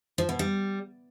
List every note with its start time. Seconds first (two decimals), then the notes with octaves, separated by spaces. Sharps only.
0.18 F3
0.29 B2
0.39 G3